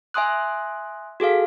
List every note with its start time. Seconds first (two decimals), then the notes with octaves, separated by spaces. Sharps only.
0.14 E5 G#5 C6 D#6 F#6
1.20 F#4 G#4 A4 F5